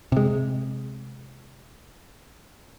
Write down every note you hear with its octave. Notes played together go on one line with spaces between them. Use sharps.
C3 G#3